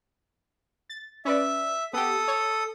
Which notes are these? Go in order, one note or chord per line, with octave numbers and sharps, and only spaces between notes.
A6
C#4 B4 D5 E5
B3 G4 A4 D#6
C#5